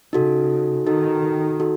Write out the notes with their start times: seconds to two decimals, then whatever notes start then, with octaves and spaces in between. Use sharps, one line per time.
0.13 C#3 D#4 F#4 A4
0.87 D#3 D#4 F#4 A4
1.60 D#4 F#4 A4